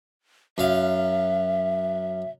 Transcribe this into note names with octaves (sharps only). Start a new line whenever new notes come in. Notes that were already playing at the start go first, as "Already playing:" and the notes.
F#2 E5 F5